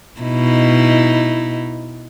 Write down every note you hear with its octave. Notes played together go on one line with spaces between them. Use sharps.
B2 D#4 E4